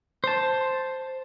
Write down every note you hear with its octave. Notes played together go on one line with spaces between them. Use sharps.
C5 A5